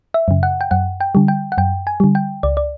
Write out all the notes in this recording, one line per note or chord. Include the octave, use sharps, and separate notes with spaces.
E5
F#2 C#3
F#5
G5
F#2 F#5
G5
D3 G3
G5
F#5
F#2 G5
G#5
D3 G3
G5
C#2 D5
D5